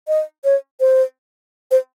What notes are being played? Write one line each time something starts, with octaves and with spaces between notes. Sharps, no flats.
D#5
C#5
C5
C5